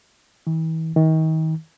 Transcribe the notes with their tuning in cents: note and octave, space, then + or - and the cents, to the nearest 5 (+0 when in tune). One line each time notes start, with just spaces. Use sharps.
E3 -40
D#3 +35